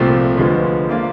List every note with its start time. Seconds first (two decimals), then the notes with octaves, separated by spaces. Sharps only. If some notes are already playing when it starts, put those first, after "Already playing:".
Already playing: C2 A#2 F3 A3 C4
0.38 D2 D3 F3 G#3 B3
0.89 F3 A#3 D4 F4